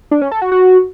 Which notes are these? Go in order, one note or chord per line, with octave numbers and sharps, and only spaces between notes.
D4
C#4
A4
F#4
F#4